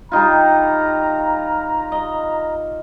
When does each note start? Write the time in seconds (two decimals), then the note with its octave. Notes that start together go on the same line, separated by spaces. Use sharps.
0.12 G3 D#4 F4 A#5
1.92 D#5